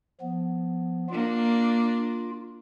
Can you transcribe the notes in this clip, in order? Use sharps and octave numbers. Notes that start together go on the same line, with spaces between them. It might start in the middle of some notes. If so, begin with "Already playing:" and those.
F3 B3
A#3 D4 F4